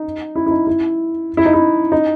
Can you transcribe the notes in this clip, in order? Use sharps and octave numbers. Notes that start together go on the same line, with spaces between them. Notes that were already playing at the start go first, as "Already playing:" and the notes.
Already playing: D#4
E4
E4
D#4
E4
E4
D#4
E4
D#4